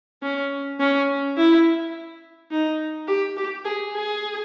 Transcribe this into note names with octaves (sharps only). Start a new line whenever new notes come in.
C#4
C#4
E4
D#4
G4
G4
G#4
G#4